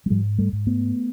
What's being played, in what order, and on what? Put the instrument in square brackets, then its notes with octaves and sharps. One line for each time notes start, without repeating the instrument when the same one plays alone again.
[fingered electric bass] F#3
G#2 F3 G3
G3 A3
G#2
A3 B3